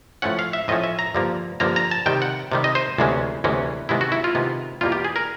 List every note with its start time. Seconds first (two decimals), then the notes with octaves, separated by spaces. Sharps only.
0.22 A2 F3 A3 C#4 F#5
0.39 F5
0.53 E5
0.68 A2 F3 A3 C#4 D#5
0.84 E5
0.99 A#5
1.15 G2 D3 F3 A#3
1.60 G2 D3 F3 A#3 A#5
1.76 A#5
1.91 A5
2.06 C3 D#3 G3 G5
2.22 F#5
2.52 C3 D#3 G3
2.64 D#5
2.75 C5
2.98 D2 C3 E3 G#3 C#4
3.44 D2 C3 E3 G#3 C#4
3.89 C3 D#3 G#3 B3 E4
4.01 F#4
4.12 E4
4.24 F4
4.35 C3 D#3 G#3 B3
4.81 E2 B2 G3 A#3 F4
4.92 G4
5.05 G#4
5.16 A#4